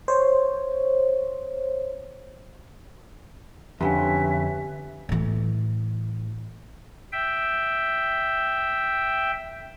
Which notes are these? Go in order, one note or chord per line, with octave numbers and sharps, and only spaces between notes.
C5 C#5
F2 D3 C#4 G4 B4 E5 G#5
A2 E3
E5 G5